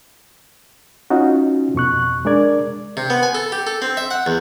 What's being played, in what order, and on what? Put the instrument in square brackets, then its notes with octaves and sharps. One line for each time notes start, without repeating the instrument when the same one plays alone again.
[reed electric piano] C#4 D#4 F4 F#4
F2 B2 C#6 F#6
G#3 D4 A#4 D5 G#6
[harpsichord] C3
B3
G#5
A4
G4
A4
C4
E5
F#5
E2